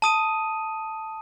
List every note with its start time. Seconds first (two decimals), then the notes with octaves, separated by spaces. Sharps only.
0.02 A5 D#6 D#7